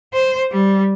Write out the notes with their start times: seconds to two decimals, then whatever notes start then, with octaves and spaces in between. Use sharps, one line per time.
0.14 C5
0.52 G3